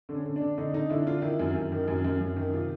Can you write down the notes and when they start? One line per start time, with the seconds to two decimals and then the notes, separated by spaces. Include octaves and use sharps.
0.09 D3
0.15 C#4
0.25 D3
0.36 D4
0.41 D3
0.58 D3 D#4
0.73 D3 D#4
0.90 D3 E4
1.07 D3 F4
1.22 D#3 E4
1.39 F#2
1.55 F#2
1.72 D#3
1.88 F#2
2.04 F#2
2.21 F#2
2.36 D#3
2.53 C3 F4